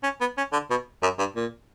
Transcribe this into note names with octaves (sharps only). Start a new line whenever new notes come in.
C#4
B3
C#4
D3
B2
F#2
G2
A#2